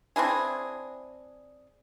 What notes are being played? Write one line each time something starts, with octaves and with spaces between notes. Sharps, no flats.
C4 D4 E4 G#4